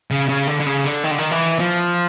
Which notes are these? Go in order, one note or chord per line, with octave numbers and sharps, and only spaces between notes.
C#3
C#3
D3
D3
C#3
D3
D#3
D3
D#3
E3
F3